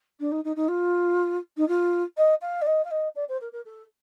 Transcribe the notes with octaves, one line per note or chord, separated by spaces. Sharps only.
D4
D#4
D#4
D#4
F4
D#4
F4
D#5
F5
D5
D#5
F5
D#5
D5
C5
A#4
A#4
A4